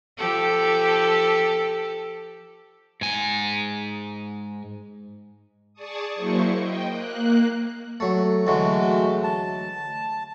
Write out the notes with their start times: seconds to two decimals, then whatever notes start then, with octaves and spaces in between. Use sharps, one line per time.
0.18 F3 G4 A4
3.01 G#2 G#5
5.74 G#4 D5 A5 C#6 D#6
6.15 F#3 A#3 E4 C5 C#6
6.55 D#5 G5
6.90 A#3 F#6
8.00 F#3 A3
8.47 D2 E3 F#3 G#3 A3 F#4
9.24 A5